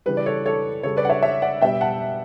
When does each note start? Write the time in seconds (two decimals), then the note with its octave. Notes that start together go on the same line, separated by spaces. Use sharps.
0.06 C#3 E3 G3 B4
0.17 D5
0.26 A4 C#5
0.46 A4 C#5
0.83 C#3 G3 A4 C#5
0.97 B4 D5
1.05 F#5
1.10 C#5 E5
1.23 C#5 E5
1.42 D5 F#5
1.61 B2 G3 E5 G5
1.81 F#5 A5